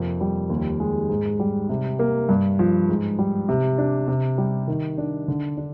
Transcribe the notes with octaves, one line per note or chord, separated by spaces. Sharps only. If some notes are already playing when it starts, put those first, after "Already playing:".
Already playing: F2 C3 A#3
G3
D#2
G#3
G#2
G3
C3
A#3
G2
F3
G#2
G3
C3
D4
C3
G3
D#3
D4
D3
D4